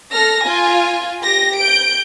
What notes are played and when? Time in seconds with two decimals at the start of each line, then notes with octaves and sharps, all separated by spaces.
0.12 A4 F6 A#6
0.44 F4 G#5
1.21 G4 A#6
1.58 G6 D7